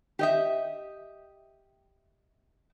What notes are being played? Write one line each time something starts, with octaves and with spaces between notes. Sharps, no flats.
G4 D#5 E5